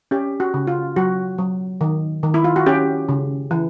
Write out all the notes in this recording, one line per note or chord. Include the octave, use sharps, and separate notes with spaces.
C#4 G4
F#4
C#3
F4
F#3 F#4
F#3
D#3
D#3
E4
F4
F#4
C#4 G4
C#3
E3